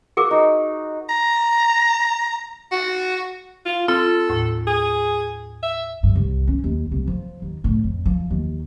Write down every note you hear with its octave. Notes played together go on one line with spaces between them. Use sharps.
F#4 G#4 A#4 D6
D#4
A#5
F#4
F4
C4 F4 A4
D#2 A2
G#4
E5
G2
C2
C#4
D#2
C2
F3
D#2
A2
F2
F3
D#2